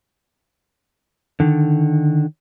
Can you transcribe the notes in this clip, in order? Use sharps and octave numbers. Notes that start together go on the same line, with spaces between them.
D3 D#3